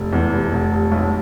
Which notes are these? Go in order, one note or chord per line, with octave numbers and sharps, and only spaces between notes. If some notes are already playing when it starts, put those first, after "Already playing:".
Already playing: F1
E2
F1
F1
F1
B1